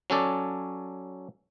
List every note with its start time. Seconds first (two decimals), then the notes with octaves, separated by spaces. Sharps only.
0.10 F#3 C#4 A4 D5